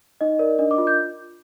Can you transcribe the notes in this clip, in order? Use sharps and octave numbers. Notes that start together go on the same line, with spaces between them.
D#4 D#5
A#4 D5
D4 D#5
D6
F4
G6